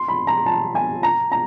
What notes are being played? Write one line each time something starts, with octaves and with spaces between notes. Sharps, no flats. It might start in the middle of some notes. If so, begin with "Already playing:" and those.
Already playing: C6
B5
A#5
A5
G#5
A#5
A#5